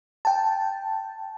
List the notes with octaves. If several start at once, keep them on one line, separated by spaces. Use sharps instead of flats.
G5 A5